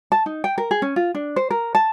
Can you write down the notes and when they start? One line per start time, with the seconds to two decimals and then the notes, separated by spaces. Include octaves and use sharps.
0.12 A5
0.26 D#4
0.44 G5
0.58 A#4
0.71 G#4
0.82 C#4
0.96 F4
1.15 D4
1.36 C5
1.51 A#4
1.75 A5